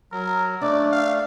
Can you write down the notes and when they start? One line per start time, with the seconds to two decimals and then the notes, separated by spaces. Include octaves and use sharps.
0.12 F#3 A#4
0.61 A3 D4 D5 D#5
0.92 F5